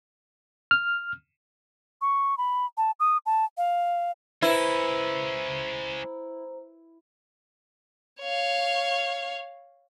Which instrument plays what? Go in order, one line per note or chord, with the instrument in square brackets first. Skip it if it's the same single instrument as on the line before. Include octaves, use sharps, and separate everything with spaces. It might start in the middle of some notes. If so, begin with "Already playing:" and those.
[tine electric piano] F6
[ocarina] C#6
B5
A5
D#6
A5
F5
[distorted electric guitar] G#3 C#4 [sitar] E4 [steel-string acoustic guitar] B4 [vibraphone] C5 A#5
[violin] C#5 F5